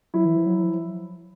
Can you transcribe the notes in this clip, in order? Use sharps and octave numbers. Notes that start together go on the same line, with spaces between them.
F#3 E4
E3
F3
F#3
F3